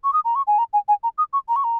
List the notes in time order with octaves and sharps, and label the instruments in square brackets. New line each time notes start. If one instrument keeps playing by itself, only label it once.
[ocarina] C#6
D#6
A#5
C#6
G#5
A#5
G#5
G#5
A#5
D#6
C#6
A#5
C#6
A#5